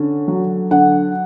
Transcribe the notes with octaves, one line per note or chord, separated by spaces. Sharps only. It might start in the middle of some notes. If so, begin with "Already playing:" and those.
Already playing: D3 C#4
F#3
D3 F#5